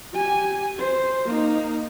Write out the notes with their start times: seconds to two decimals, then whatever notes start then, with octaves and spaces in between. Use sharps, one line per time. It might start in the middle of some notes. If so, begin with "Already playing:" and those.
0.13 G4 G#5
0.78 C5
1.25 A#3 D#4